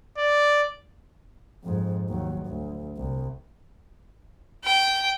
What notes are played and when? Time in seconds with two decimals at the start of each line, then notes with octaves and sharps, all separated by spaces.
0.17 D5
1.64 F2 G#2
2.08 D#2 F#3
2.47 D2
2.97 C2
4.64 G5